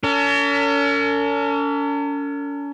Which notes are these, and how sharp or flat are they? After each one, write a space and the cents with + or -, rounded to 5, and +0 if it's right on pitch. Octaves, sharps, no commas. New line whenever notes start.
C#4 +40 A#4 -45